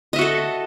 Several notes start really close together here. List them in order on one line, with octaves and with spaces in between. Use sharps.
D#5 E5 F#4 A4